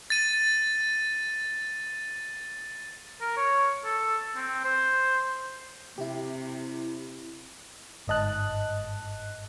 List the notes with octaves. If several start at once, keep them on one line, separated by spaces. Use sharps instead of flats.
A6 D#7
A#4
C#5
A4
C4
C5
C3 E4 G4
G1 G#2 D#5 A5 F#6